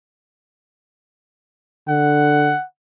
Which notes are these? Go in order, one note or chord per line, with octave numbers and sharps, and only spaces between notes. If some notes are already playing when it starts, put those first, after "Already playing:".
D3 F#5